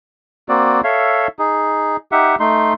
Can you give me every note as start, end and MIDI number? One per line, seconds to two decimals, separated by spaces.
0.49 0.81 58
0.49 0.81 60
0.49 0.81 66
0.49 0.81 74
0.84 1.28 69
0.84 1.28 73
0.84 1.28 76
0.84 1.28 77
1.39 1.97 63
1.39 1.97 68
2.12 2.36 63
2.12 2.36 67
2.12 2.36 76
2.12 2.36 78
2.40 2.73 57
2.40 2.73 63
2.40 2.73 84